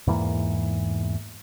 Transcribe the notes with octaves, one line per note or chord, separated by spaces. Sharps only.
E2 G#2 E3 A#3